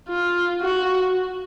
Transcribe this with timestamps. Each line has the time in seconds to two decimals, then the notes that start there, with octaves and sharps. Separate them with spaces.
0.09 F4
0.62 F#4